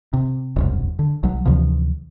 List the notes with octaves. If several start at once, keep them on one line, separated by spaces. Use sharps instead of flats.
C3
E1 C2 F#2
D3
B1 F#3
D2 C3 E3 F3